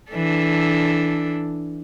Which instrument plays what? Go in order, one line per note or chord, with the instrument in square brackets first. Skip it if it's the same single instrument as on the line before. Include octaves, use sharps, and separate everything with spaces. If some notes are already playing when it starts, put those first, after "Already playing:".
[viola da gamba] E3 D4 A4